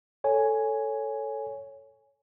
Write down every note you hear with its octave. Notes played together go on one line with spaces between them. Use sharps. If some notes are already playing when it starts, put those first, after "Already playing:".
A4 C#5 G#5